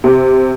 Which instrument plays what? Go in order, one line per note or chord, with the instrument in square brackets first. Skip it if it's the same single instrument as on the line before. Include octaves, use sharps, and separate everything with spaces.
[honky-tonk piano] C3